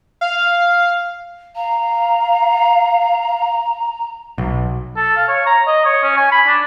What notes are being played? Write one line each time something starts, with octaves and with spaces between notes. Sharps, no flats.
F5
F5 A#5
B1
A4
F5
C#5
A#5
D#5
C#5
C#4
G#5
B5
D4